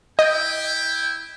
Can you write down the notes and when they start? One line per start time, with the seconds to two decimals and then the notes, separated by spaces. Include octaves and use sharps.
0.19 E4 D#5 G5